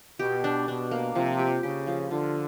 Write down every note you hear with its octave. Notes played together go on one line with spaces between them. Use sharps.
B2 G4
D4
B2 D4
A#3
C3 F3
G4
C#3 G4
F3
D3 F4